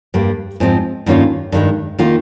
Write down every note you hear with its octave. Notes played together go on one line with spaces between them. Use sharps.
G2 G3 A#3
G#2 F3 C4
G2 D#3 A#3 C#4 F4
G2 D#3 G#3
D#3 A#3 F4